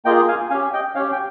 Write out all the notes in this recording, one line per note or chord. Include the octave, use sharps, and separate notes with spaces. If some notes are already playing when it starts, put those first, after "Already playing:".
A#3 F4 G#4 D#5 G5
F5 G#5
C#4 G4 F5 G#5
D#5 G5
C#4 G4 C#5 F5
G5